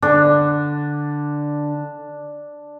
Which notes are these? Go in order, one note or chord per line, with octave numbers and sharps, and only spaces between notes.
D3 D4